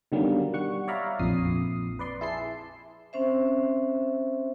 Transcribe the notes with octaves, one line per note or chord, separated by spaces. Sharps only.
B2 D3 D#3 F#3 G3 A#3
G3 F#5 C#6
C#5 D5 E5 F5 A#5 B5
A#1 F2 D#6 C7
B4 D5 C6
E4 G#4 A5 C6 C7
C4 C#4 C5 E5